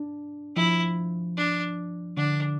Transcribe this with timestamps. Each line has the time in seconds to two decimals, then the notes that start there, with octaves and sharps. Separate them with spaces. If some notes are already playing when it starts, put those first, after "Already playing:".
Already playing: D4
0.56 F3 E4
1.37 D4
2.17 D3 D4